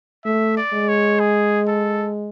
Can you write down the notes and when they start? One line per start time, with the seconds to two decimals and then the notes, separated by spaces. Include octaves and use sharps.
0.25 A3 E5
0.57 D5
0.73 G#3
0.89 C#5
1.20 G#4
1.68 A4